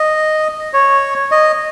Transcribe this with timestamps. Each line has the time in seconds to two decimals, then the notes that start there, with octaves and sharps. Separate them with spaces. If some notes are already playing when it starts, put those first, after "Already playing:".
Already playing: D#5
0.73 C#5
1.31 D#5